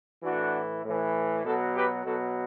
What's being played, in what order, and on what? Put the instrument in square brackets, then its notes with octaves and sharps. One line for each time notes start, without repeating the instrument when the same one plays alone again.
[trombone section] A2 E3 D4 F#4
A2 E3
B2 F#3 F#4 A4
G4 B4
B2 F#3 F#4 A4